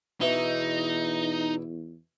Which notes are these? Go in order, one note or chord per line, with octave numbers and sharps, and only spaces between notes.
E2 B2 E3 D#4 E4